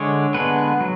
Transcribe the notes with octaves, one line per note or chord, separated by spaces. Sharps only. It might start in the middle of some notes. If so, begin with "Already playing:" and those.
Already playing: D3 G#3 C#5
D3 G#3 B3 B4
F#3